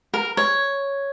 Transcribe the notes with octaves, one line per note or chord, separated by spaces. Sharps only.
A#4
C#5